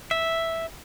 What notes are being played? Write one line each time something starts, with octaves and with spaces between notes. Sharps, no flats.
E5